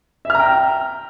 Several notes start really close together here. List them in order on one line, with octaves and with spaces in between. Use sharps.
E5 F6 A#5 G5